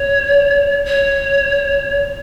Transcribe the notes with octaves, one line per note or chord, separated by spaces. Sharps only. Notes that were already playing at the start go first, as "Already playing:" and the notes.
Already playing: C#5
C#5